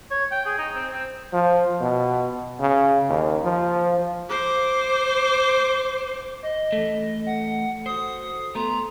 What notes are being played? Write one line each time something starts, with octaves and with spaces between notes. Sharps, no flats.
C#5
G5
G#4
D#4
C4
C4
F3
B2
C#3
D#2
F3
C5 D6
D#5
E3 A3 A4
F#5
F#4 C5 D#6
A3 B3 A4 A#5 C6